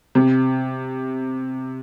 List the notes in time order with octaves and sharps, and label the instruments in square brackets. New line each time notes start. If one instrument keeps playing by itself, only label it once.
[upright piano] C3